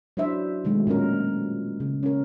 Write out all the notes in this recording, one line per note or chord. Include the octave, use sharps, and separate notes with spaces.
F#3 D4 E4 C5 E5
B2 D#3 F3 F#3 G#3 A3
A#2 F3 C#4 A#4
C#3
C#4 A#4